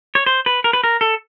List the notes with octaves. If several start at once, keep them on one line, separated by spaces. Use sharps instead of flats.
C#5
C5
B4
A#4
B4
A#4
A4